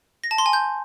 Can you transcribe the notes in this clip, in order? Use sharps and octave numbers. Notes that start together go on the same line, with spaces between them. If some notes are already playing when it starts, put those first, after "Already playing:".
A#6
A5
C6
G#5
G6